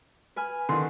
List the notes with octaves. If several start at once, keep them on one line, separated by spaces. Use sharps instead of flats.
B4 G#5 F6
D3 D#3 C6